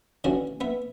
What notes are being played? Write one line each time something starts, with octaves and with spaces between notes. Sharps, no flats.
D3 E3 C#4 F#4
B3 E5